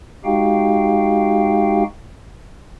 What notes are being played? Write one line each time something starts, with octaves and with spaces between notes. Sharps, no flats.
G#3 D#4 F#4 G4 F5 G5